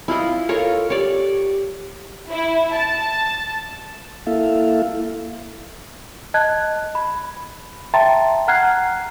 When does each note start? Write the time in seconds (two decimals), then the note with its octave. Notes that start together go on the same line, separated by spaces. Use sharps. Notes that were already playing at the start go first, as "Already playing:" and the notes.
0.08 E4 F4 D#5
0.49 F4 A4 A#4 C#5
0.90 G4 C#5 D5
2.30 E4
2.72 A5
4.27 A#3 E4 A4 E5 F5
6.34 D#5 A5 F#6 G#6
6.95 B5
7.94 E5 G5 A5 A#5 C6 A6
8.48 F#5 A#5 F6 F#6 G#6 C7